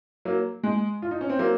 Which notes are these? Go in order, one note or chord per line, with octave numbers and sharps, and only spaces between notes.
F#3 A#3
G#3
F4
D#4
C#4
C4
F#3 A#3